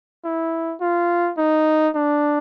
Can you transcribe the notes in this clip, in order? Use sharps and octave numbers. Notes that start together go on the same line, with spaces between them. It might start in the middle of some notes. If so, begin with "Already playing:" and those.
E4
F4
D#4
D4